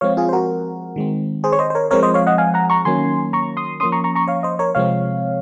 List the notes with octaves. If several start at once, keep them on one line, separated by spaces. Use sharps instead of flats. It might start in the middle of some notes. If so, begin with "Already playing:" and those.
F3 G#3 C4 C#5 F5
F4 G#4
C5
F#4 A#4
D#3 G#3 C4
G#4 C5
C#5
C5 D#5
C5
A#4 C#5
F3 G#3 C4 A#4 C#5
C5 D#5
C#5 F5
D#5 F#5
F5 G#5
F#5 A#5
A#5 C#6
D#3 F#3 A#3 C#4 G#5 C6
A#5 C#6
C6 D#6
F3 A#3 C#4 C6 D#6
A#5 C#6
A#5 C#6
A#5 C#6
C#5 F5
C5 D#5
A#4 C#5
C3 F3 G#3 C4 C#5 F5